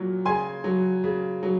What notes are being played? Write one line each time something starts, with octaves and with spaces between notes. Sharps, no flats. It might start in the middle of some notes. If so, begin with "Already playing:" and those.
Already playing: A#2 F#3
C#3 G#5 C6
F#3
C#3
F#3